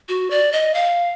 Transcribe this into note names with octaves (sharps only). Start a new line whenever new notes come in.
F#4
D5
D#5
F5